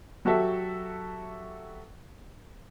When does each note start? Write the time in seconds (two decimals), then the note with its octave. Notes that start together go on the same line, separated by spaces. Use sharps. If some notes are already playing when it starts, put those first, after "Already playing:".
0.25 F#3 F#4 G4 A4 E5